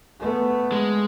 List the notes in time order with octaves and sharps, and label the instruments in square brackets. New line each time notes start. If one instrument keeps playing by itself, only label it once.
[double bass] A3 B3
[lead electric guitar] G#3